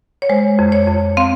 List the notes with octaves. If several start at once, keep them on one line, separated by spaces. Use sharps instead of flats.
C#5
G#3 C5
F2
C#5
F2
C4 F5